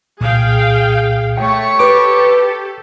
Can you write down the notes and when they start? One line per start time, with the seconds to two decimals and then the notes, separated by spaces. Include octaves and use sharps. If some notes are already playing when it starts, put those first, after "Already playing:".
0.21 C2 A#2 G#4 F5 G5
1.37 A3 C#5 G5 C#6
1.79 G4 A4 B4 D6